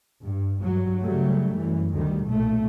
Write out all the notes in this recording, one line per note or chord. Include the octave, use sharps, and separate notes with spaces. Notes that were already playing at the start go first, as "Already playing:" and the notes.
G2
G2 F#3
C#3 F#3 G3 A3
F#2 E3
D2 D#3 G3
B1 A#2 A3